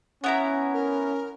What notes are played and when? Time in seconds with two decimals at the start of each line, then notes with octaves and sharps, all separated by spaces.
0.24 B3 C#4 E4 A#5
0.73 A#4